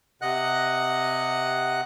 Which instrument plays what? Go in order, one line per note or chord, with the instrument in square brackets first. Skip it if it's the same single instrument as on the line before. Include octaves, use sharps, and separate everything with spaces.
[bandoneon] C3 D#5 F#5 F#6